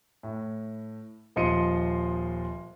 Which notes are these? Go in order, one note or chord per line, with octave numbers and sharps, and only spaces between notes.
A2
D#1 F3 D#5 C6 C#7 D#7